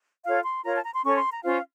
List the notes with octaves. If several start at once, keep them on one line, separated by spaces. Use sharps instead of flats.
F4 A4 C#5 F5
C6
F4 A#4 C#5 A#5
A5
A#5
C6
C#4 A4 C#5 C#6
C6
A#5
C#4 F4 C5 F5